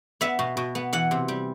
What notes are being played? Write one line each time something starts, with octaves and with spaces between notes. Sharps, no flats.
B3 E5
B2
B2
B3
E3 F#5
C3
G3